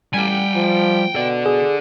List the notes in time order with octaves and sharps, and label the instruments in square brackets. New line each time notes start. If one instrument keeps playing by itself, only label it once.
[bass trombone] A1 [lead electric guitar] G3 [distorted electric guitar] G5 G#5
[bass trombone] F3
[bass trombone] B2 [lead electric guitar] A4 D5
[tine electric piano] G#4